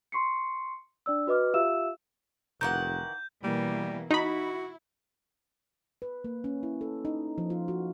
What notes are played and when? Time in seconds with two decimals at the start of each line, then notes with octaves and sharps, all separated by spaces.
0.12 C6 C#6 C7 C#7
1.06 D4 D5 E6
1.27 F#4 B4 D#5 D6 F6
1.54 F4 G4 E5 F5 E6 E7
2.61 F1 D#3 E3 F#5 G6
3.44 B2 E3 G3 A#3
4.11 D#4 E4 F#4 B5
6.02 B4
6.24 A#3
6.44 C#4
6.63 E4
6.81 A4
7.05 D#4
7.38 F3
7.50 F4
7.68 F#4